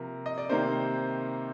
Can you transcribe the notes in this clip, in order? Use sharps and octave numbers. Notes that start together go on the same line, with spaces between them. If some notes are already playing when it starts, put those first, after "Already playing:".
Already playing: C3 F3 A#3 A#4
D#5
D5
C3 D#3 A#3 C5